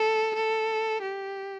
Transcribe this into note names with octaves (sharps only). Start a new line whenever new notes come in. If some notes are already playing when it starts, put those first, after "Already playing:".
Already playing: A4
A4
G4